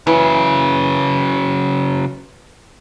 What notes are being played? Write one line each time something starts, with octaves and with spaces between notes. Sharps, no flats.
C#3 E3 F#3